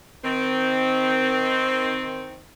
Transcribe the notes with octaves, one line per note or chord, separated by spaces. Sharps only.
D#3 C4